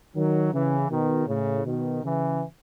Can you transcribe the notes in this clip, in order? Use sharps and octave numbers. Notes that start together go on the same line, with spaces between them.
D#3 F#3
C#3 E3
B2 D#3
A2 C#3
B2 D#3
C#3 E3